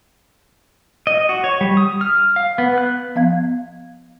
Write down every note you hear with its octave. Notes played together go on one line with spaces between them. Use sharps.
D#5
F#4
C#5
G3
D#6
F6
F5
B3
F#6
F3 B3 F5 G#6